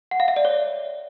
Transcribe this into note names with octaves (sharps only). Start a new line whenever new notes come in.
F#5
F5
E5
D5
C#5